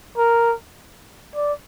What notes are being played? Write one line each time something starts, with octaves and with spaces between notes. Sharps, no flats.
A#4
D5